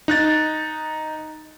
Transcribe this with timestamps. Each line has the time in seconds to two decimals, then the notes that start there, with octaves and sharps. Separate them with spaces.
0.08 D#4 F#6 A6